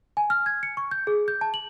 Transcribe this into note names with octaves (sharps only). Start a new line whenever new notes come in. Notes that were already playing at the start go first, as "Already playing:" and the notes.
G#5
F6
G#6
C#7
C#6
G6
G#4
G6
A5
F#7